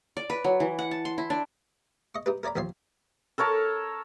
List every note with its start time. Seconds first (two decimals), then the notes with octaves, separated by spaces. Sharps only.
0.17 D5
0.30 B4
0.44 F#3
0.60 E3
0.79 F#5
0.91 A5
1.05 C6
1.18 E4
1.30 D4
2.15 D#5 C#6
2.26 D#4 G4 B4
2.43 A#4 C#5 D5 A#5 B5
2.56 D#2 A#2 F3 C#5 C6
3.38 A4 A#4 C#5 A5